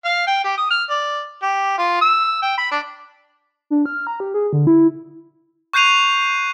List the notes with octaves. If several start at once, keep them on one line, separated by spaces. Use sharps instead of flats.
F5
G5
G4
D#6
F6
D5
G4
F4
E6
G5
B5
D4
D4
F6
A#5
G4
G#4
D3
E4
C#6 F#6 G6 C7 D#7 F7